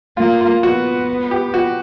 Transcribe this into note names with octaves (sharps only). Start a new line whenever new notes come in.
A#3 F4
F4
B3 F#4
G4
F#4